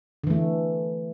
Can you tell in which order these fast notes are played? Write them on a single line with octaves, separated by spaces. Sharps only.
D3 E3 A3